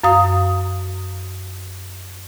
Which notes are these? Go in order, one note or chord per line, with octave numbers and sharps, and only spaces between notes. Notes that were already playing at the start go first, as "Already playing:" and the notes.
F#2 F5 D#6